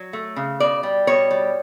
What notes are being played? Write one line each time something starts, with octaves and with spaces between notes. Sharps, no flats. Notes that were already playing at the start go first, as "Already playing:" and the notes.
Already playing: F#3
A3
C#3
B2 D5
G3
B2 C#5
G3